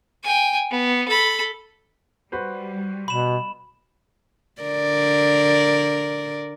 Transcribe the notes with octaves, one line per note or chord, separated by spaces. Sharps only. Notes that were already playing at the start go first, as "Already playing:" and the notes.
G5 G#5
B3
A4 B5
G3 F#4 B4 C5
B2 B5 E7
D3 A#4 D5